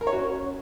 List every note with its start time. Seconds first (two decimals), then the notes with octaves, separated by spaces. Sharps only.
0.01 A#4
0.07 C#5
0.13 F#4
0.19 C#4